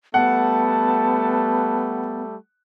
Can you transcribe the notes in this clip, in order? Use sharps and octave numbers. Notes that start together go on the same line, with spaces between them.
G3 A3 B3 F#5 A5